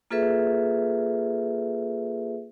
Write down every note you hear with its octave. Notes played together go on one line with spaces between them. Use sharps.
A#3 F4 G#4 A4 B4 E5